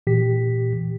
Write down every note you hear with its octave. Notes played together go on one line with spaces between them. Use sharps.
A#2 E3 G4 B6